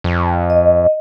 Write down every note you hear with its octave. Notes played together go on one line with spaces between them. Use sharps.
F2
D#5